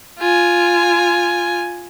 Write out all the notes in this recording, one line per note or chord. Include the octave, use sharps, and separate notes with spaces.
F4 G#5